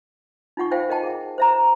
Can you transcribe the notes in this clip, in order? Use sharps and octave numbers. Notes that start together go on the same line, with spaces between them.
D#4 F4 F#5 C#6
C5 E5 F5 G5 G#5
A#4 D#5 F#5 G5 A5
G#4 F#5
C5 E5 A#5
A#5